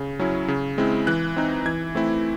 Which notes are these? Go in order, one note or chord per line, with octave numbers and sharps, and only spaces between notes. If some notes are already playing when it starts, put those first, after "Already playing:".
Already playing: C#3
F#3 C#4 E4
C#3
G#3 C4 E4
E3 F#6
C4 D#4
E3 G#6
A3 C4 E4